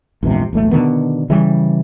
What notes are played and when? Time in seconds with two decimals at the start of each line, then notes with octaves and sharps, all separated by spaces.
0.23 A#1 E2 G#2 C3
0.53 E1 B1 A2 A3
0.71 B2 D3 D#3 B3
1.30 C#3 E3 G3